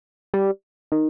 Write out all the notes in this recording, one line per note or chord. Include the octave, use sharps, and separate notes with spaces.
G3
D#3